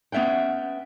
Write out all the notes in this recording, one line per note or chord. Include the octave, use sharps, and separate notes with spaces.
B3 C#4 E5 F#5 G5